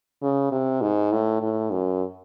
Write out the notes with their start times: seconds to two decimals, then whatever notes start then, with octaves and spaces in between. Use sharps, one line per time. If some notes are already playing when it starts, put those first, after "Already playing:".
0.22 C#3
0.52 C3
0.81 G#2
1.12 A2
1.42 A2
1.72 F#2